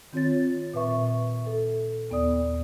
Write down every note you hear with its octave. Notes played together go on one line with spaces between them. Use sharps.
D#3 C4 F4 C#5 A6
A#2 B4 E5 C#6
A4
D#2 B3 D5 D#6